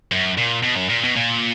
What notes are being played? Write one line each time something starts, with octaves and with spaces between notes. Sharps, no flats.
F#2
A#2
B2
F#2
A#2
B2
A#2